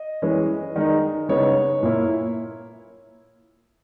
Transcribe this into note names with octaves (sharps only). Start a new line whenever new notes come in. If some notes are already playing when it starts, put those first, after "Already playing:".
Already playing: D#5
E3 G#3 C#4
D#3 G#3 D#4
C#3 G#3 B3 D#4 C#5
A#2 A#3 E4